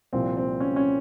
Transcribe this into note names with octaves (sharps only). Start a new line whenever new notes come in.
C2 A#2 F3 C4
C4
C#4
C#4